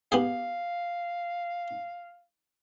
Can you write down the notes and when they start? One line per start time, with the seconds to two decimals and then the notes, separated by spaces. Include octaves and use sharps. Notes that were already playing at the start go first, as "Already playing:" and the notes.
0.12 B3 G4 G#4 F5